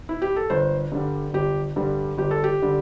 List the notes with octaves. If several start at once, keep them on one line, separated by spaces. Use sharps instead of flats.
E4
G4
A4
G1 C5
G2 D3 G3
G1 G4
G2 D3 G3
G1 G4
A4
G4
D3 G3